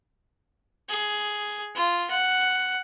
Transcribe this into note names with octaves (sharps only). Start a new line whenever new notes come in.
G#4
F4
F#5